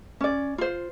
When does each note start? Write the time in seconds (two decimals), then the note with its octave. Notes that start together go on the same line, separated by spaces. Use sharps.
0.21 C#4 D5
0.58 F4 C5